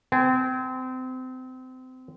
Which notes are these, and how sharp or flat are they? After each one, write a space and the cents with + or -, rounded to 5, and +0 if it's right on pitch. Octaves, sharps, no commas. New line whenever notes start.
C4 -30 G#5 +15